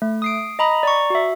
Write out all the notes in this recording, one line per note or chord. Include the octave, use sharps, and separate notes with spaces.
A3
D#6 C7 D7
D#5 A#5 B5 D#6
D5 A#5 C#6
F#4 E5